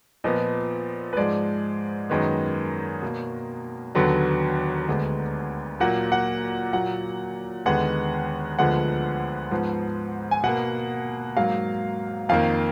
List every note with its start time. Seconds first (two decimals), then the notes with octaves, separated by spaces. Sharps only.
0.24 A#2 F3 B3 D#5
1.13 B4
1.17 G#2 F3 G#3 D5
2.10 F#2 D#3 G#3 B3
3.02 B2 A#3
3.95 D#2 D3 F#3 B3
4.88 D2 D3 G#3 B3
5.80 A#2 F#3 A#3 F#5
6.12 F#5
6.73 A#2 F#3 A#3 F#5
7.66 D#2 D3 G#3 B3 F#5
8.59 D2 D3 F3 G#3 B3 F#5
9.51 G#2 F3 B3
10.31 G#5
10.43 B2 A#3 F#5
11.37 G#2 F#3 A#3 F5
12.29 F2 D#3 A#3 F5